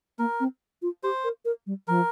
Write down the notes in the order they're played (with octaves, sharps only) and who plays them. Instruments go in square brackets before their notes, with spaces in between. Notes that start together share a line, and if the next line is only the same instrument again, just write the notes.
[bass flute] A#3 [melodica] A#4
[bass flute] C4
F4
[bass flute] G4 [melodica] C5
[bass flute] A#4
A#4
G3
[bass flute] F3 [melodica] A#4